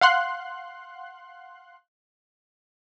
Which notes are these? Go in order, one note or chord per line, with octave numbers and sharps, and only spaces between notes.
F5 F#5 C6 F#6